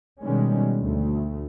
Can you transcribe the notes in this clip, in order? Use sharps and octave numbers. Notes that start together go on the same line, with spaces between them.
B2 D#3 G3 G#3 C#4
D2 A3